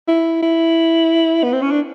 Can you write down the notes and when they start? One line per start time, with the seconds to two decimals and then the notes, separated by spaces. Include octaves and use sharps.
0.08 E4
0.42 E4
1.43 B3
1.53 C4
1.62 C#4
1.71 D4